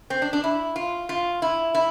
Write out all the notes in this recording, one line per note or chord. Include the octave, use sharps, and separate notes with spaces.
C4
D4
D4
E4
F4
F4
E4
E4